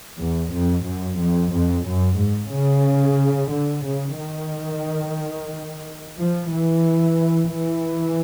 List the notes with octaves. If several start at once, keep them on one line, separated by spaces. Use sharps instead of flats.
E2
F2
F#2
F2
F2
F#2
G#2
C#3
D3
C#3
D#3
F3
E3
E3